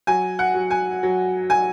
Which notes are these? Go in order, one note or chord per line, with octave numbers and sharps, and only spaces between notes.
F#3 G#5
F#5
F#3
G#5
F#3
F#3 G#5